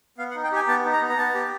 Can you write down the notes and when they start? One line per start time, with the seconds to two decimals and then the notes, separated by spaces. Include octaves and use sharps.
0.18 B3 F5
0.31 F#5
0.35 D#4
0.44 G5
0.52 G4 G#5
0.68 B3 A5
0.85 D#4
0.93 A#5
1.01 B3
1.09 A#5
1.18 B3 A5
1.34 G4